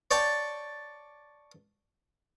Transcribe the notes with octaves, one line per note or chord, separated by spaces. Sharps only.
C#5 D5 G5 A5 C#6